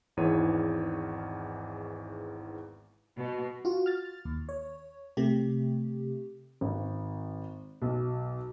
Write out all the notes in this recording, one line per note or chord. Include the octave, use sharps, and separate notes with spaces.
G#1 E2 G#2 E3 C#5 D#7
B2
F4 F#4
F6 A6
D#2
C#5
C3 A3 G4
G#1
B1